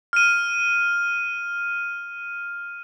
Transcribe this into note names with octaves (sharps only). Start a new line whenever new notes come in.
F6 D#7